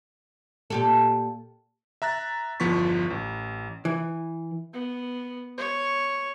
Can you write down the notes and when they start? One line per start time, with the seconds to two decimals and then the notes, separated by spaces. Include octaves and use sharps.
0.70 A#2 G4 A4
2.02 E5 A#5 F#6 A6
2.60 G1 E2 F3 B3 C#6 B6
3.10 A1
3.85 E3
4.74 B3
5.58 C#5